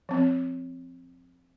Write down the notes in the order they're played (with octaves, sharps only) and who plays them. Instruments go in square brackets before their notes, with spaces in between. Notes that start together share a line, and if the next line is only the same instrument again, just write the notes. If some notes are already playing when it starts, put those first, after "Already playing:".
[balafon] F3 C4